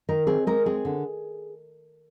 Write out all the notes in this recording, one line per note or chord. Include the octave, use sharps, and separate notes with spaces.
D#3 A#4
C4 G#4
G#3 A#4
C4 G#4
D3